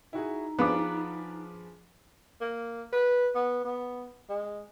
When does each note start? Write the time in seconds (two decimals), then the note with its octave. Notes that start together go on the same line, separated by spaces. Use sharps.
0.13 D#4 E4 F#4 G#4
0.59 F3 B3 D4 G#4 F5 D6
2.41 A#3
2.93 B4
3.35 B3
3.65 B3
4.29 G#3